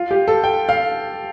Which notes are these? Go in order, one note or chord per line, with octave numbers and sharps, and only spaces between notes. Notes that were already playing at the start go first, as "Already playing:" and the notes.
Already playing: F4
G4
A4
G5
F5